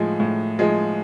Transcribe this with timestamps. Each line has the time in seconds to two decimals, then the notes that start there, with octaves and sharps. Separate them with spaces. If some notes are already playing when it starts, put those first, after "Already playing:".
Already playing: A2 F3 G#3
0.20 A2
0.59 F3 G#3